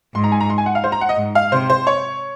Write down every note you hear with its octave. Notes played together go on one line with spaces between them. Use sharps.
G#2 C6
A#5
G#5
A#5
C6
G#5
F#5
F5
C5
A#5
F#5
D#5
G#2
F5
C3 C5
C5
C#5